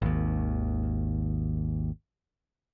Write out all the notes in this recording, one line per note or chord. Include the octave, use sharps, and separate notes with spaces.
G#1 D#2